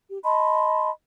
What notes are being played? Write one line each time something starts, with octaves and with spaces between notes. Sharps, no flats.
G4
D#5 A5 B5 C6